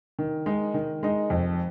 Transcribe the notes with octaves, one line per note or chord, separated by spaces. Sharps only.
D#3
G#3 D#4
D#3
G#3 D#4
F2